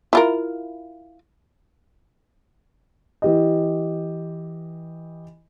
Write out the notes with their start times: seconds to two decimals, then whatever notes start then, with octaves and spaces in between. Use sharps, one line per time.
0.13 E4 F4 A#4
3.22 E3 G4 D#5